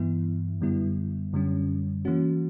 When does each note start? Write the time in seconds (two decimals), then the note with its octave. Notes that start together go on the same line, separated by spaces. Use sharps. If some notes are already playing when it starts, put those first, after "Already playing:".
Already playing: G2 E3 B3 E4
0.61 F#2 D3 G3 B3 E4
1.33 F#2 D3 G3 C#4
2.05 E3 A#3 C#4 F#4